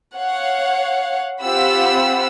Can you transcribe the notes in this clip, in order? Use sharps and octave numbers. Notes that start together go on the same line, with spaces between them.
C#5 F5 F#5
C4 F4 G4 F#5 B5 E6